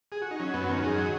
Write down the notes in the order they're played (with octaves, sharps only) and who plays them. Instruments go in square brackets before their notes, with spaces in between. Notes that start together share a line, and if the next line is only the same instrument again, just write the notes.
[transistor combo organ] G#4
F#4
D#4
F#3 C#4
F#2 B3
D#3 C#4
F#2 G#4
F#3